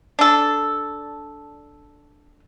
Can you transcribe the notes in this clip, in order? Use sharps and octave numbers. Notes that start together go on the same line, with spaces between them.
D4 A4